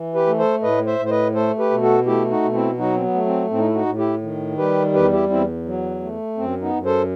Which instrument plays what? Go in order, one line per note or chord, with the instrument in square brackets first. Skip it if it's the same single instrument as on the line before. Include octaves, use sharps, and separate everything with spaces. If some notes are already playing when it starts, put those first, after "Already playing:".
Already playing: [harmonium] E3
G4 B4
A3
A4 C5
A2 B4 D#5
C5 E5
A2
C5
B4 D#5
A3 A4 C5
G4 B4
B2
F#4 A4
A3 E4 G4
D#4 F#4
B2
C4 E4
F#3 D#4 F#4
C4
B3
A3
C4
A2 C4
D#4
E4
D#4 F#4
A2
E4 G4
D#3
G3 G4 B4
E2 G4 B4
E4 G4
E2 C4 E4
F#3
A3
F#2 C4
B3 D#4
F#2
A4 C5